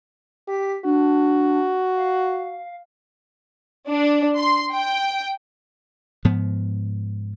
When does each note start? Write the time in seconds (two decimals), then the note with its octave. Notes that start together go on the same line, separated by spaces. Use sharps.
0.48 G4 B6
0.85 D4 F#4
1.95 F5
3.88 D4
4.36 C6
4.72 G5
6.25 G#2 F3 B3